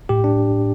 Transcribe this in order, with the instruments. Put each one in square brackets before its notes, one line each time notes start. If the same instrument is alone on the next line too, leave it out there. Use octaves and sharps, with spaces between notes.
[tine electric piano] A2 G4
D4